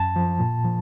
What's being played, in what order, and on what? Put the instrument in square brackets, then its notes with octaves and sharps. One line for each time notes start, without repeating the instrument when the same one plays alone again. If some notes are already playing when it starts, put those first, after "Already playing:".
Already playing: [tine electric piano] F#2 A5
F3
A#2
F3